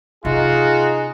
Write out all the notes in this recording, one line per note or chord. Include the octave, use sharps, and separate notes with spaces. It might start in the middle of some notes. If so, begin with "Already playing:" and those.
C3 C#4 D#4 F4 F#4 G#4